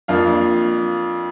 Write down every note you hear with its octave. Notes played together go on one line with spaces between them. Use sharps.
F2 F3 A#3 D4 F5